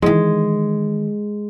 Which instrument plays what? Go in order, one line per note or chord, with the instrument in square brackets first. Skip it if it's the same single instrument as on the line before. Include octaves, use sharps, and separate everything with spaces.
[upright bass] D#3 E3 [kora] G#3